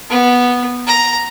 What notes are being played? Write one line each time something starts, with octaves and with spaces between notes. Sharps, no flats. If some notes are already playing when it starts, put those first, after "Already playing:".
B3
A#5